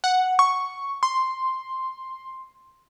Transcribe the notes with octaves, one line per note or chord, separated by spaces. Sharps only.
F#5
C#6
C6